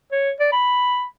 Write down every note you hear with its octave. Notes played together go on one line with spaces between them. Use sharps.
C#5
D5
B5